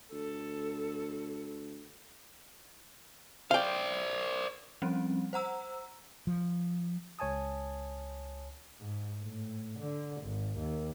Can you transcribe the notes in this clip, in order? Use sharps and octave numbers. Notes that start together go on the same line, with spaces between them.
D2 A4
C5 D5 F5 G5
F3 G3 C4 C#4
C5 F#5 A#5 E6
F3
C#2 C#5 G#5 A5 D#6
G#2
A2
D3
G#1
D#2